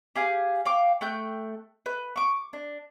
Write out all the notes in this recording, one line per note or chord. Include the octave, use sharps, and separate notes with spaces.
G4 G#4 F5 G#5
F5 G5 D6
A3 G5 F#6 G6
B4
C#6 D6
D4